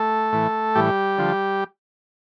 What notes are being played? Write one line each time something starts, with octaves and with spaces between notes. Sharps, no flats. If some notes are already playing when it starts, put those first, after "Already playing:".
Already playing: A3 A4
A2 E3
A2 E3 G3 G4
D3 F3